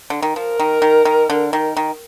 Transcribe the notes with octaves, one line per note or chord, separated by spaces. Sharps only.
D3
D#3
F3 A#4
D#3
D#3
D#3
D3
D#3
D#3